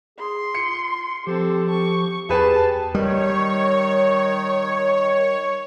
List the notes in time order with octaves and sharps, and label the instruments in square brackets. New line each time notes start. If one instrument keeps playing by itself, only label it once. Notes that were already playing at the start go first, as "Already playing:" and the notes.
[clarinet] G#4 [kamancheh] C6
[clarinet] F4 [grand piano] C#7
[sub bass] F3 [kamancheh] C4 A4 [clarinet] G4
[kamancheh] C#6
[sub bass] E2 [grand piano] G4 G#4 B4 [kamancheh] A5
[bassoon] D#3 [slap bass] G3 [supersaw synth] C#5